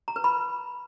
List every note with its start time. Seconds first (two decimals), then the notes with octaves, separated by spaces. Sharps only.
0.08 A#5
0.16 B4
0.24 B5